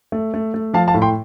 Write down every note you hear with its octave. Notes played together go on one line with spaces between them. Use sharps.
A3
A3
A3
F3 F5 A5
F5 A5
A2
G5 C6